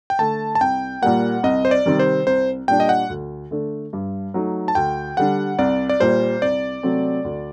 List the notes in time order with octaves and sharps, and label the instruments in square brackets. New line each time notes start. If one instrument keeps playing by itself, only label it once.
[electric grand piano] G5
[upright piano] D3 A3 [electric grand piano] A5
[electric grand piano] A5
[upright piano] C2 [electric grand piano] G5
[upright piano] A#2 G3 A#3 [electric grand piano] F#5
[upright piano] C2 [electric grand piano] D#5
[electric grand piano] C5
D5
[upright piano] C3 D#3 G3 C4
[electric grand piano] C5
[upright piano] C2 [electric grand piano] C5
[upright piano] A#2 G3 D4 [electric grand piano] G5
[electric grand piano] D#5
F#5
[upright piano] D2
D3 A3 D4
G2
F#3 A3 D#4
[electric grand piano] A5
[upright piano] D2 [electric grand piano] G5
[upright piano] D3 G3 D4 [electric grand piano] F#5
[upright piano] C2 [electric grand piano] D5
[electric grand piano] D5
[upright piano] A#2 G3 [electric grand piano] C5
[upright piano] C2 [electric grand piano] D5
[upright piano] C3 F#3 A3 C4
D2